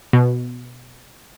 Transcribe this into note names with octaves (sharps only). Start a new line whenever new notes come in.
B2